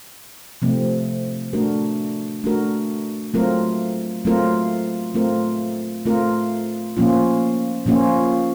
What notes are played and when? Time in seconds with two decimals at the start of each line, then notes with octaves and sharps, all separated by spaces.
0.62 C3 F3 A3 C4
1.53 A3 D4 F#4 A#4
2.44 A3 D4 F#4 A#4
3.34 F#3 A3 C4 F4 A#4
4.25 F#3 A3 C4 F4 A#4
5.15 A3 C4 F4 A#4
6.05 A3 C4 F4 A#4
6.97 A#2 F3 A#3 C#4 F4
7.86 A#2 F3 A#3 C#4 F4